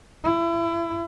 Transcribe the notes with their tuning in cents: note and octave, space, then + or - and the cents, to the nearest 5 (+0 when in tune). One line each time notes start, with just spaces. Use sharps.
E4 +30